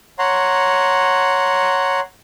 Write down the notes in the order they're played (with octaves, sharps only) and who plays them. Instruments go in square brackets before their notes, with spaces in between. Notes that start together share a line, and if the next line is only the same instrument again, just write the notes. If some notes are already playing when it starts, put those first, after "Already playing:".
[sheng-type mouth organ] C#5 F#5 A#5 C6